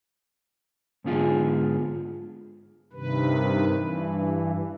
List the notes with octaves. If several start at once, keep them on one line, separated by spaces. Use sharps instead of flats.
G#2 D3 B3 F4 G#4
G2 C3 D#3 B4
G2 E3